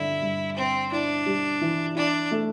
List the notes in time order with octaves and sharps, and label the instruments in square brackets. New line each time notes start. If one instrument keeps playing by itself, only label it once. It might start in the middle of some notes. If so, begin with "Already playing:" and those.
Already playing: [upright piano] G2 D3 [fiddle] E4
[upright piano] G2
[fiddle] C4 [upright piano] C5
[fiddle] D4 [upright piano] E4
[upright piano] G3
E3
[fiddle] D4 [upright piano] E4
[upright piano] A3